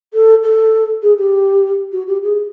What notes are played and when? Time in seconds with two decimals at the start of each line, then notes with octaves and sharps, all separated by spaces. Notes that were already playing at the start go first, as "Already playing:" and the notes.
0.14 A4
0.44 A4
1.03 G#4
1.18 G4
1.92 F#4
2.07 G4
2.22 G#4